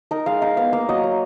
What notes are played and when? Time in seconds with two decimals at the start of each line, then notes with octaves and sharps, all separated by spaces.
0.11 D#4 A#4
0.26 G#3 F5
0.42 D#4 F5
0.57 B3 F5
0.73 A#3 F5
0.89 F#3 D#5
1.04 F#3